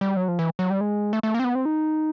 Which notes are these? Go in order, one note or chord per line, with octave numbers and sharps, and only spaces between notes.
G3
F#3
F3
E3
F#3
G3
G#3
A3
A3
A#3
C4
B3
C4
D#4